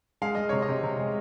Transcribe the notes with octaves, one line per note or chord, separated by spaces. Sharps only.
G#3 F5
G#3 D#5
C3 C#5
D#5
C3
C3
G#3